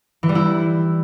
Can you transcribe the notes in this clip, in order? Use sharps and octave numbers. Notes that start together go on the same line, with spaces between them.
E3
G3
E4